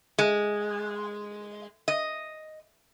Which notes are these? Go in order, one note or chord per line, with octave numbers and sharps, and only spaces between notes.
G#3
D#5